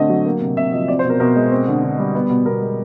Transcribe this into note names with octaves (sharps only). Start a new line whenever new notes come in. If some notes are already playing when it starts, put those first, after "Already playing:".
Already playing: D3 A3 C4 D#5
F#3
A#3
C3
C3 E5
F3 D#5
C4 D5
C5
B2
A#4
B2 A#4
G#3
C4
D3
D3
G3
B3
B2
B2 A#4
G#3